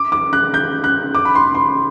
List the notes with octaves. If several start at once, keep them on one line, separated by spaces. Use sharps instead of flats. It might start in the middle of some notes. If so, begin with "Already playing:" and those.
Already playing: D6
D6
F#6
G6
F#6
D6
B5
C6
C6